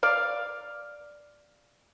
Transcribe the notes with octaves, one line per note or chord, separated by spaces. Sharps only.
D5 F5